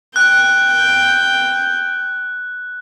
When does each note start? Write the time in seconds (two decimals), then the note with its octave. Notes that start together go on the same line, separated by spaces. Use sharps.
0.16 G5 F#6